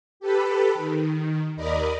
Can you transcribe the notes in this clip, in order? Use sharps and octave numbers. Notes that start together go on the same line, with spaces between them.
G4 A4 B4 B5
D#3
D#2 A#4 D5 D#5 B5